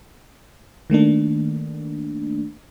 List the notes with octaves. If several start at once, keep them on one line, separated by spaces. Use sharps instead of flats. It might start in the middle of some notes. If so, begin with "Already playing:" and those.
D#3 A3 A#3 D4